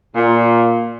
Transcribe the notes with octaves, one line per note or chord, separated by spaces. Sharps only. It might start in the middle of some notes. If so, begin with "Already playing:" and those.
A#2